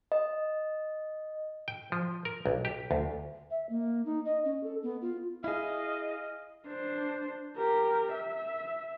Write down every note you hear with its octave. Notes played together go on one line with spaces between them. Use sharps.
D#5
G5
F3
A#4
B1
G4
D2
E5
A#3
D#4
D#5
C#4
A4
B3
F4
E4 G#4 D#5 F5
D4 C5
G4 A#4
E5